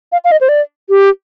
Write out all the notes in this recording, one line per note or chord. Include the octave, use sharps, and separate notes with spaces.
F5
F5
D#5
C5
D5
G4